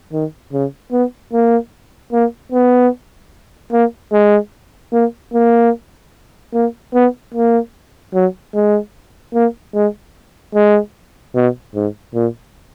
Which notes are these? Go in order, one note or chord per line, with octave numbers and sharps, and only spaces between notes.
D#3
C#3
B3
A#3
A#3
B3
A#3
G#3
A#3
A#3
A#3
B3
A#3
F#3
G#3
A#3
G#3
G#3
B2
G#2
A#2